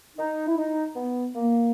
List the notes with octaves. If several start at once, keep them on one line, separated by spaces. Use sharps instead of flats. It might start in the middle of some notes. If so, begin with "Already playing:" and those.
D#4
E4
D#4
B3
A#3